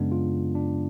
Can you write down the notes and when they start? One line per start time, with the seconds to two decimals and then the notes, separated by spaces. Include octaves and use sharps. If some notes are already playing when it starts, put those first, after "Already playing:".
Already playing: F#2 C#3 G#3 B3 D4
0.12 F4
0.55 D4